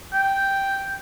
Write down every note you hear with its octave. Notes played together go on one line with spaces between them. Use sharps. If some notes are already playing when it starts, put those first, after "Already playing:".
G5